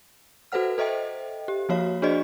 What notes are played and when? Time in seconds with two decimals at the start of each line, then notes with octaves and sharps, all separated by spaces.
0.52 F#4 A4 B4 C5 F#5 F6
0.78 A4 C5 D#5 E5 G5
1.48 G4
1.69 F3 A#3 F#4 C#5 F5
2.02 D4 F#4 G#4 C5 D5 D#5